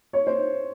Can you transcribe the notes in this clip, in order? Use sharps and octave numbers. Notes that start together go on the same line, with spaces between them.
C#5
C5